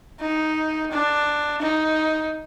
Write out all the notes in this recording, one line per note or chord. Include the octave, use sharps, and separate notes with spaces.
D#4
D4
D#4